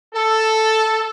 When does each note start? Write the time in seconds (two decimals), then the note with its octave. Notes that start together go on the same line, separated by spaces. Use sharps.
0.14 A4